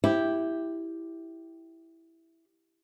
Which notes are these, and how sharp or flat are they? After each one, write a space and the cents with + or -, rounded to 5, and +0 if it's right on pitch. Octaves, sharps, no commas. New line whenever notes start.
E4 +0 G4 +0